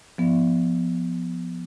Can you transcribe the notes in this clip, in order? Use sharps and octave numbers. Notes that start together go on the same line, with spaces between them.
F3 B3